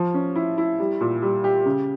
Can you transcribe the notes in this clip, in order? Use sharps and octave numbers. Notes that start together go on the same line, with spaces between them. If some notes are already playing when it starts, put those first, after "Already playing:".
Already playing: F3
C#4
E4
E4
G3
A#2
G3
G4
C#3